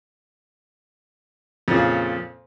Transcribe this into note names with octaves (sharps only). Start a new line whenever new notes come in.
F2 A#2 C#3